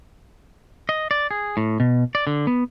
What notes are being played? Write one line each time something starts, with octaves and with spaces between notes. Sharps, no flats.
D#5
D5
G#4
A2
B2
D5
D3
B3